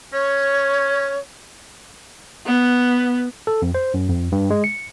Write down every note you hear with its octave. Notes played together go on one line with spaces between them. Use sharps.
C#4 C#5
B3
A4
F2
C5
F#2
F2
G2
G#3
C#7